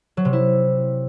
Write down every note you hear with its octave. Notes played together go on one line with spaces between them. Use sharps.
F#3
C3
E4